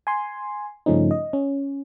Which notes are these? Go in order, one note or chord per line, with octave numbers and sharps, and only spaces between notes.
G#5 C6
G2 C#3 F3 A3 C#4 D#4
D#5
C#4